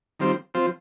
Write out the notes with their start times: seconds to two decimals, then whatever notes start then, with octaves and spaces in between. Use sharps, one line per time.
0.19 D#3 G3 C4 F4 C5
0.54 F3 C4 F4 C5